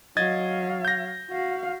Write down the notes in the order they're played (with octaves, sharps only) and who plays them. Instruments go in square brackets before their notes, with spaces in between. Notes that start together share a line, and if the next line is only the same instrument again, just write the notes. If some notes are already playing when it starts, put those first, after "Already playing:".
[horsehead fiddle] F#3 F5 [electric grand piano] D#5 G#6 A6
[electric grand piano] G6 A#6
[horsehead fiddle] F#4 F5